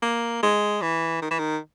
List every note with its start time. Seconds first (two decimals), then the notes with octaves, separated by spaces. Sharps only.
0.03 A#3
0.43 G#3
0.82 E3
1.22 D#3
1.31 E3
1.39 D#3